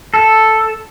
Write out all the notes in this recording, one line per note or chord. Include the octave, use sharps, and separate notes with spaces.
A4